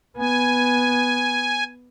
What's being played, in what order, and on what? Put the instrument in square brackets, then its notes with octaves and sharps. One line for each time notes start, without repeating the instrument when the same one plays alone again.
[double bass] B3 [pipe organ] G#5